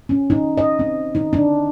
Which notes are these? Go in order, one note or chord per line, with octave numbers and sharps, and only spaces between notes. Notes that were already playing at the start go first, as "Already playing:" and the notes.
C#4
D#4
D#5
C4
D#4
D4